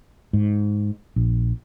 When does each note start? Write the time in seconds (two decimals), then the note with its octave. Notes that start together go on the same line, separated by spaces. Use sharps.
0.33 G#2
1.16 A#1